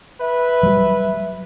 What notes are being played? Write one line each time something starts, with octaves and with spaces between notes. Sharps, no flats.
B4 E5
F#3 G3